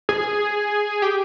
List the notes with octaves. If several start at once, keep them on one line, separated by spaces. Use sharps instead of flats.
G#4
G4